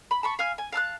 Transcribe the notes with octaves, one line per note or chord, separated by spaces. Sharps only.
B5
A5 B5 C#6
F5 G#5 F6
G#5
F5 A5 F6 F#6